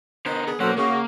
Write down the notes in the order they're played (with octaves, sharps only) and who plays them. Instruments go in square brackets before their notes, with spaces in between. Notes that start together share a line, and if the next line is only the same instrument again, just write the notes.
[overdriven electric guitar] D3 A#4 [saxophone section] B3 C5 D#5
[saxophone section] B3 G#4
[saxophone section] B2 C#4 F#5 [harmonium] F#3 A4 C5 [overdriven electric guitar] A#3
[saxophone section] C#3 [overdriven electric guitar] A#3 [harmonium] F#4